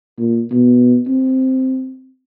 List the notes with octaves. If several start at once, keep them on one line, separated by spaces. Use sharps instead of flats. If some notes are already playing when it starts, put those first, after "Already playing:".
A#2
B2
C4